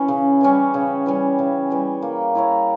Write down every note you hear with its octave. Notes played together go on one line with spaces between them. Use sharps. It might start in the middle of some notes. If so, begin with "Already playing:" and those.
Already playing: E3 C#4
C#3
E3 G3 C#4
C#3
E3 G3 C#4
C#3
E3 G3 C#4
A#3
E4 A#4 C#5